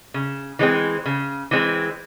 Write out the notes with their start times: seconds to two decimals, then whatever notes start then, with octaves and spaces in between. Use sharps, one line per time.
0.14 C#3
0.59 E3 G#3 C4
1.06 C#3
1.51 E3 G#3 C4